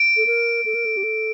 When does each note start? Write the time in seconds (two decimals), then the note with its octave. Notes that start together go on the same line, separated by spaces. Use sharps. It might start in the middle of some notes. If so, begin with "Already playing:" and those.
Already playing: D7
0.17 A4
0.27 A#4
0.66 A4
0.75 A#4
0.85 A4
0.97 G4
1.04 A4